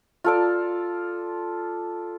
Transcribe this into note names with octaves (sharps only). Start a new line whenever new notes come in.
F4 A4 D5